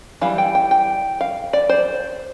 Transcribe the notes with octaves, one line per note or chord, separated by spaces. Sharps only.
E3 G3 F5
G5
G5
G5
F5
D5
C5